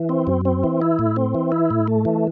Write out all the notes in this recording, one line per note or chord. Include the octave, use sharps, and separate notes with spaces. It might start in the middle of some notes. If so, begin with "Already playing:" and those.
Already playing: E3
C4
F#2
C4
E3
E4
A2
C4
E3
E4
A2
A3
E3